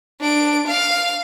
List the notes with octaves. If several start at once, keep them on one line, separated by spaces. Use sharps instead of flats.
D4 D7
F5